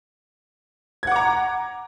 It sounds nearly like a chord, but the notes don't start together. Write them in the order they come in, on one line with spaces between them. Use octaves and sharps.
G#6 F#5 D6 A#5